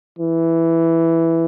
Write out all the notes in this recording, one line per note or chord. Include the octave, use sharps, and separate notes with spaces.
E3